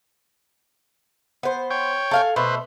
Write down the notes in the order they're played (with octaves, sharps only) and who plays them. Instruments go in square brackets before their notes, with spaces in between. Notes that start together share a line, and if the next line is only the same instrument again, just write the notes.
[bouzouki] B3 C5
[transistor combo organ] C#5 G5
[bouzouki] A4 F5 G#5
[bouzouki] B2 A3 [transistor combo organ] B4 C5